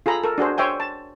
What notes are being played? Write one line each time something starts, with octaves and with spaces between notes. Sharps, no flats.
F4 G#4 A4 A#5 B5
A4 A#4
D4 F#4 G#4 C5
C5 C#5 E5 G5 G#5
A5